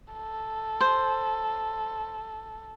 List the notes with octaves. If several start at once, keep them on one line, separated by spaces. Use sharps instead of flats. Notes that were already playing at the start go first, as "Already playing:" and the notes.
A4
C5